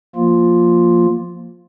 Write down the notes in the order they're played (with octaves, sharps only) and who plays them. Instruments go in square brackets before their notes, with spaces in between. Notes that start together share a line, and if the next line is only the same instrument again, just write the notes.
[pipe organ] F3 A#3 F4